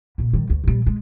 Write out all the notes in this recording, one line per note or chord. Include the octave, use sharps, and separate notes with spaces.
A#2 C#3
D#3 G3
D2
A#2 G3
G#3